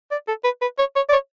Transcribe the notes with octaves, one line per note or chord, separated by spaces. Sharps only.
D5
A4
B4
B4
C#5
C#5
D5
C#5